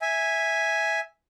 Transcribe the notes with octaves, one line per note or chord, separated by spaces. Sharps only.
E5 G#5